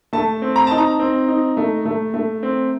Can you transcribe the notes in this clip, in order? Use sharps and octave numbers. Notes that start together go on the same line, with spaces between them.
A3 A5
C4
A#5
D#4 A5
A#5
C4
D#4
A3
A3
A3
C4